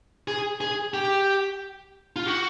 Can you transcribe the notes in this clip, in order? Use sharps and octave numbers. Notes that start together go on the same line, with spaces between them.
G#4
G#4
G4
F4
F#4